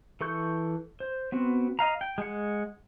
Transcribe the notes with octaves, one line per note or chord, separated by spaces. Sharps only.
E3 A4 C#6 G6
C5
B3 C4 F#4
D#5 F5 A#5
G5
G#3 F#5